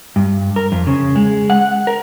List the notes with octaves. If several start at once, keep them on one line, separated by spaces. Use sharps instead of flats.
G2
A#4
F2
C#3
G#3
F#5
A#4